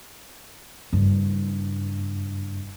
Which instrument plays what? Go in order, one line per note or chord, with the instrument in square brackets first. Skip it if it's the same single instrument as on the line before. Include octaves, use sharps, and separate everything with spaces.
[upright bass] F#1 G2